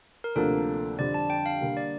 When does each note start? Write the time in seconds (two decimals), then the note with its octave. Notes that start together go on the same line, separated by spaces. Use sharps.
0.24 A#4
0.36 D2 C3 F3 A#3 D4 A4
0.98 F2 D3 G3 C4 D5
1.14 A5
1.30 G5
1.46 F5
1.61 D3 G3 A#3
1.77 D5